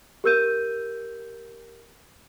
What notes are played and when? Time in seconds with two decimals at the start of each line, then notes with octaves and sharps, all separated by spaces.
0.24 G4 A#4 E6 G6 D#7